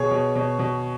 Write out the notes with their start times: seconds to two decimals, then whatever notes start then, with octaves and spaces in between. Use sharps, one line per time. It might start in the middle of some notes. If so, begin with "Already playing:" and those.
Already playing: B2 G#4 C#5
0.11 B2
0.35 B2
0.59 B2